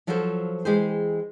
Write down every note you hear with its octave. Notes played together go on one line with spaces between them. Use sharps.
F3 F#3 F4 F#4 A4 C5
E3 G#3 G4 G#4 C5